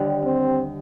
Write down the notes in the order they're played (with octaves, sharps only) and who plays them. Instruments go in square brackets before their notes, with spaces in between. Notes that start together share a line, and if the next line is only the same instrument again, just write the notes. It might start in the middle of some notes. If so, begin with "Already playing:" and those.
Already playing: [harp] D#2 D3 G3 D4
[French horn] C4